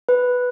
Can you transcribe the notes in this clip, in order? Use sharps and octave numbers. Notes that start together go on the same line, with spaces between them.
B4